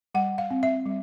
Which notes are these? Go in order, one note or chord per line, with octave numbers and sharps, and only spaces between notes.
G3 F#5
F5
C4
E5
G3